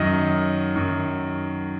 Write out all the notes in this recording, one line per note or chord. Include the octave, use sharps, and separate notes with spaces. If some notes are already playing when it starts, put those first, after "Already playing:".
Already playing: F#2 D#3 F#3 D#5
F#2 D#3 F#3